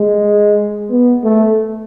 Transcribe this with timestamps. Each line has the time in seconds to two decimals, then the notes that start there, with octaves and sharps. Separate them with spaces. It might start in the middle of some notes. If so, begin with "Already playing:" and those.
Already playing: G#3
0.90 B3
1.24 A3